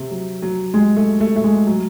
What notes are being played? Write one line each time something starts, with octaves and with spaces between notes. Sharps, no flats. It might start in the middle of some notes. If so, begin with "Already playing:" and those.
Already playing: C3
F#3
F#3
G#3
A3
A3
A3
G#3
F#3